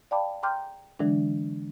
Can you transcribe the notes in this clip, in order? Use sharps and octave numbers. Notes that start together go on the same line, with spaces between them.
D5 F5 G5 A5 B5 D6
G5 A#5 C6 D6 F6 G6
D3 E3 F#3 G#3 D4